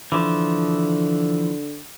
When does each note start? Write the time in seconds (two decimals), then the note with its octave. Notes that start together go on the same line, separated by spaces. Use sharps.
0.12 D3 E3 F3